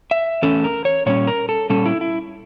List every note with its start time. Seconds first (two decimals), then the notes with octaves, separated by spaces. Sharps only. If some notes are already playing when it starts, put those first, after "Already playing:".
0.11 E5
0.42 E2 E3 A3 C#4 A4
0.64 A#4
0.85 C#5
1.06 A#2 G3 C#4 C#5
1.27 A#4
1.49 A4
1.70 A#2 G3 C#4 A4
1.86 E4
2.01 E4